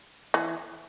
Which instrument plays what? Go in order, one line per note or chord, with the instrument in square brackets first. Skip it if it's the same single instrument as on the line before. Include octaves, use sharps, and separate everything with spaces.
[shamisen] E3